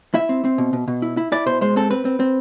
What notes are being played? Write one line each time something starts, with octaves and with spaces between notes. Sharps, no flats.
E4 E5
C4
C4
B2
B2
B2
E4
E4
E4 D5
B2 C5
G#3 C5
C4 A4
C4 B4
C4
C4